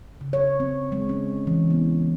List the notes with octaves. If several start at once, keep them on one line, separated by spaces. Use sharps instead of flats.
C#3
C#5
C4
G#3
C#4
E3
B3